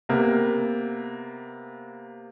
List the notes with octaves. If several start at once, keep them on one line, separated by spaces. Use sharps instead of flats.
C3 A#3 B3